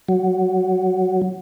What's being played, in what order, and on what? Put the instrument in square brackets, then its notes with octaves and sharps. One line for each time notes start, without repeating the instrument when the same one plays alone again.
[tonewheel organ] F#3